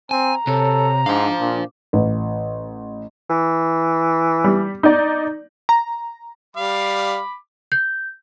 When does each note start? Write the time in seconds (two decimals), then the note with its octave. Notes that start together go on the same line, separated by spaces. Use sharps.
0.11 C4 G#5 A#5
0.47 C3 A4 C#5
1.06 G#2 D4 C5 F5
1.40 A#2
1.93 A1
3.30 E3
4.44 G3
4.83 D#4 D5
5.69 A#5
6.57 G3 F5 B5 D6
7.72 G6